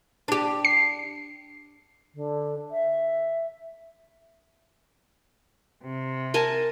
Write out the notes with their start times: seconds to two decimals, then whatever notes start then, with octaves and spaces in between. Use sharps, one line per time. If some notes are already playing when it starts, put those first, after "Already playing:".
0.28 D4 G4
0.65 C7
2.14 D3
2.71 E5
5.84 C3
6.34 A#4 G#5 A5